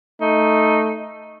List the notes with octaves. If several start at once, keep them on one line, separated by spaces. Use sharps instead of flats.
A3 D#4